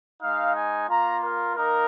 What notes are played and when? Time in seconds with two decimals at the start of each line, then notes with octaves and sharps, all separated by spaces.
0.21 G#3 D#4 F5
0.55 G#5
0.88 A#3 F4 A#5
1.22 A#4
1.55 A#3 D#4 A#4